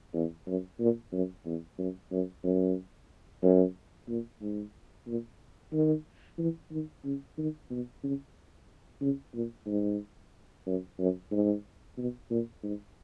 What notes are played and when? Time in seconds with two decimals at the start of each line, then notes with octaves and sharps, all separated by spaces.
0.14 E2
0.47 F#2
0.80 A#2
1.13 F#2
1.46 E2
1.78 F#2
2.12 F#2
2.44 F#2
3.43 F#2
4.09 A#2
4.42 G#2
5.07 A#2
5.73 D#3
6.39 E3
6.71 D#3
7.05 C#3
7.38 D#3
7.70 B2
8.03 C#3
9.02 C#3
9.34 A#2
9.67 G#2
10.66 F#2
10.99 F#2
11.32 G#2
11.97 B2
12.30 A#2
12.63 G#2